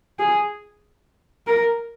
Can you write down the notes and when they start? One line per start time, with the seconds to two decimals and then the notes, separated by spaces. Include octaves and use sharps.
0.19 G#4
1.47 A#4